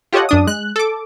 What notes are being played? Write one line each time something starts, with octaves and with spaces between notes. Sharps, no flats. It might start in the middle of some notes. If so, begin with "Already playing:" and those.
F4 G4 A4 C#5 D#5 F#5
F#2 D4 D#6
G#3 F#6
A4 D6